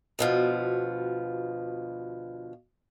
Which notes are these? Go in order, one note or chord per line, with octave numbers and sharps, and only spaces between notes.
D2 B2 F3